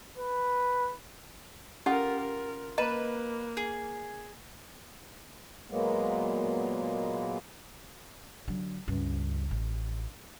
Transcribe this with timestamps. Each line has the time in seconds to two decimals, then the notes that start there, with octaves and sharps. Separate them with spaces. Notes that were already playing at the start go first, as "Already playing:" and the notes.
0.18 B4
1.86 C#4 F4 G4 A4 A#4 F#5
2.21 A#4
2.78 A#3 B4 D#5 A#5
3.57 G#4
5.71 A#2 F#3 G#3 A#3 B3
8.48 D3 F#3
8.88 C#2 G2
9.51 A1